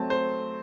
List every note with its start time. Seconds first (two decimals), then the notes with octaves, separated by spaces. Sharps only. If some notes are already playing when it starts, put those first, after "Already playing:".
Already playing: F#3 A3 C4 A5
0.10 C5